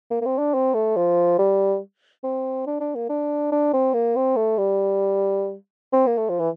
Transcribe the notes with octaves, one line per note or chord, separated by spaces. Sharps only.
A#3
A#3
C4
D4
C4
A3
F3
G3
C4
D4
D4
A#3
D4
D4
C4
A#3
C4
A3
G3
C4
A#3
A3
F3
E3